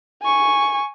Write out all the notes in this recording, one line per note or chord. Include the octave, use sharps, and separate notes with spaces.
G#5 C#6